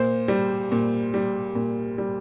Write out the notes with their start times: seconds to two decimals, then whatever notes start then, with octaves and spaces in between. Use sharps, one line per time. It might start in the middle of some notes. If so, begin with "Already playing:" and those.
Already playing: A#2 C5
0.28 G3
0.72 A#2
1.14 G3
1.55 A#2
1.98 G3